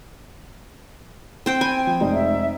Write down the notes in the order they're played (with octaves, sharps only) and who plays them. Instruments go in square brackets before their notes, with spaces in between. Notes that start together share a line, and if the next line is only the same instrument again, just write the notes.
[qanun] C4 C5 G5
[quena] G5 [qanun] G#5 [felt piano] B5
[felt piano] F3
F1 G#3 D#4
[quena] E5